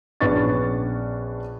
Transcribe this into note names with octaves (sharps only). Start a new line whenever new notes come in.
A#1 B3 C#4 D4 C#6 A6